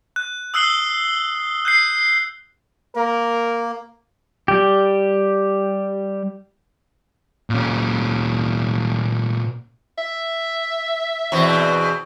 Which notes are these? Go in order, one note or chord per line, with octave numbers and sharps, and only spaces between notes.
F#6
D#6 E6 F#6 C7 F#7 G7
F#6 G6 C7
A#3 A#4
G3 G4
A#2 C#4
E5
E2 B2 C4